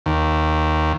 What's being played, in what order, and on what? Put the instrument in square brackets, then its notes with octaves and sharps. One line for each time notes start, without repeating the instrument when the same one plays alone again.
[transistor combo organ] D#2